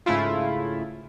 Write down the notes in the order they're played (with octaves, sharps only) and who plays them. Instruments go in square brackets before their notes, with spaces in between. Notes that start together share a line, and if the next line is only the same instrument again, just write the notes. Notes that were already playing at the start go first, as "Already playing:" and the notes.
[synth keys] G#2 C#3 A3 E4 F4